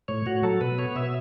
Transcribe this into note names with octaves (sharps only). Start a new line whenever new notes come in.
A2 C#5
A2 F#4
F#3 A4
B2 B4
B3 C#5
B2 E5